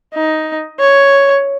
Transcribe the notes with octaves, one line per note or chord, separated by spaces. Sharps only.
D#4
C#5